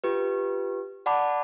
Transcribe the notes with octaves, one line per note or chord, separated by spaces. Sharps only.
F4 G4 B4
D5 F#5 A5 B5 D6